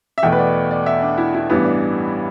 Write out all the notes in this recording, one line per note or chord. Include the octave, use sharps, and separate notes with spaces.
E5
E2 B2 A3 G5
B4
D5
D5
E5
D4
E4
E4
A1 G2 E3 G3 B3 E4
D4